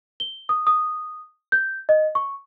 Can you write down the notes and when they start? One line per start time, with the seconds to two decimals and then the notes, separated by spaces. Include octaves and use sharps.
0.20 G7
0.49 D#6
0.67 D#6
1.52 G6
1.89 D#5
2.15 C#6